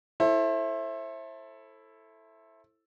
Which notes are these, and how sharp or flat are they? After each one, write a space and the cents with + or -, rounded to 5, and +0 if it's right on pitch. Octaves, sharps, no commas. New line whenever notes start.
E4 +0 A4 +0 C5 +35